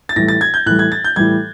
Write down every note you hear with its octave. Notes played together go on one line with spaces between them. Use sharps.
A6
A2 E3 G3 A#6
A6
G#6
G6
A2 E3 G3 F#6
G#6
A6
G6
A2 E3 G3 G#6